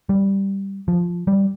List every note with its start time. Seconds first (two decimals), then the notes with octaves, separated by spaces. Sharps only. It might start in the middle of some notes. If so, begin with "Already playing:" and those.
0.09 G3
0.88 F3
1.27 G3